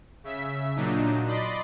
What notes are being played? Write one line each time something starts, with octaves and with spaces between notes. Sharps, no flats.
C#3 E5 B6
A#2 F#3 D4 D#4
D5 D#5 B5 C6